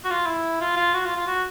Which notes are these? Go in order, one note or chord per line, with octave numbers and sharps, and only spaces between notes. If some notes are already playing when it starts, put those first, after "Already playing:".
F#4
F4
E4
F4
F4
F#4
F4
F4
F#4